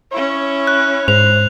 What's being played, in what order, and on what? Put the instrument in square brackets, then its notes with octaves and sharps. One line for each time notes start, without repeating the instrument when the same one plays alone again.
[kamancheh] C#4 E4 [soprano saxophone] C#5
[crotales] F#6
[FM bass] G#2 [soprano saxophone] C5 [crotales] F7